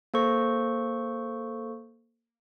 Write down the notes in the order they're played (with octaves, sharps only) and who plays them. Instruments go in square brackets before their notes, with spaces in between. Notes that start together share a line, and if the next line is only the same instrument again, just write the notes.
[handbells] A#3 A4 C5 C#6